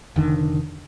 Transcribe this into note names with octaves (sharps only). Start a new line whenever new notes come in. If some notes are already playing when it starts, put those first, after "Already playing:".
F1 D3 D#3